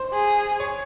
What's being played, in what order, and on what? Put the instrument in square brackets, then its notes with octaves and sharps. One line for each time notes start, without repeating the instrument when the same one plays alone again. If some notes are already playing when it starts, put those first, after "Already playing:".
Already playing: [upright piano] C5
[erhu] G#4
[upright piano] C#5